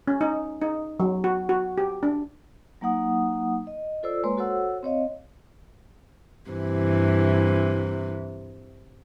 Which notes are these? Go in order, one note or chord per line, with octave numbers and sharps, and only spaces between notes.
C#4
D#4
D#4
F#3
F#4
F#4
G4
D4
F#3 A#3 D#4 F#5 D#6
D#5
F4 A4 C5 D5 E6
G#3 A#3 B4 C#5 C6
F#4 A4 C5 C#5 F#5 E6
C4 C#5 D#5 F5
G2 C3 E3